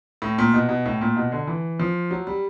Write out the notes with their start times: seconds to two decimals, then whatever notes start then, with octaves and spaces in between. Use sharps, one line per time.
0.22 A2
0.38 A#2
0.54 B2
0.69 B2
0.86 A2
1.01 A#2
1.17 B2
1.32 D3
1.47 E3
1.80 F3
2.11 F#3
2.27 G3